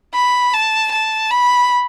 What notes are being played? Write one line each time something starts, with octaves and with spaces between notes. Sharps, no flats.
B5
A5
A5
B5